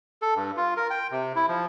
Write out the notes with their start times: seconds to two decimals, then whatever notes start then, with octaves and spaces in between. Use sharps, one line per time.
0.22 A4
0.35 G2
0.57 F4
0.77 A#4
0.90 G5
1.11 C3
1.36 E4
1.49 F3